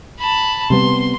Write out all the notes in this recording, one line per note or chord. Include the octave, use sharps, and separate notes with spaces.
A5 B5
C3 G3 B3 C6